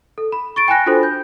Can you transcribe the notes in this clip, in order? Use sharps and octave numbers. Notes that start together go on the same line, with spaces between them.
A4
B5
C#6 A6 D7
G5 G#5 B5 F#6 A#6
D4 F4 F#4 A4 C5
G6